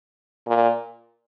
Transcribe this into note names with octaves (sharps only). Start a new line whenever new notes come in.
A#2